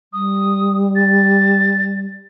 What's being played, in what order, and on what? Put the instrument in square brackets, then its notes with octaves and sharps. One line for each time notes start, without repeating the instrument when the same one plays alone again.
[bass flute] G3 [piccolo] D#6
[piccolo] A6